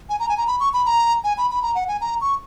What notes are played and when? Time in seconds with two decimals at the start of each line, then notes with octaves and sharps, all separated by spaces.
0.09 G#5
0.20 A#5
0.29 G#5
0.38 A#5
0.47 B5
0.60 C#6
0.74 B5
0.86 A#5
1.24 G#5
1.38 B5
1.51 B5
1.62 A#5
1.75 F#5
1.88 G#5
2.01 A#5
2.21 C#6